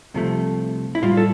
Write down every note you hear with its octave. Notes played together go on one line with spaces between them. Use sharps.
C2 C3 F3 A3
E4
A2 G3 F4
A4